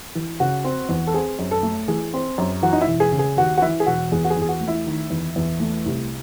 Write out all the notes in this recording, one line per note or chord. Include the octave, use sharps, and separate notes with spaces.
E3
C#3 F#4
C4
E2
A4
C4 G#4
F#2
A4
A3
E3 G#4
C4
F#2
E3 F#4
D#4
E4
E1
G#4
C#3
G#4
D#2 F#4
F#4
E3 E4
G#4
E1 F#4
E2 G#4
F#4
G#4
E2
G#4
F#4
A3
E4
D#3
E2
E2
A3
C2